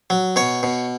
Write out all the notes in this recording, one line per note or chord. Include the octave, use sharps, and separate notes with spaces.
F#3
B2 C#5
B2